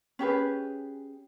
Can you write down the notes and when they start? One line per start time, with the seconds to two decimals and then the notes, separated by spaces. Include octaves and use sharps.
0.19 C#4 G4 G#4 B4